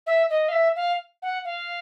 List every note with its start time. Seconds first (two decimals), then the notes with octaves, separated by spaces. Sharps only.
0.07 E5
0.30 D#5
0.49 F5
0.52 E5
0.76 F5
1.22 F#5
1.45 F5